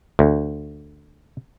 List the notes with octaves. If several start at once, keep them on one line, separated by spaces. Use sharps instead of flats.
D2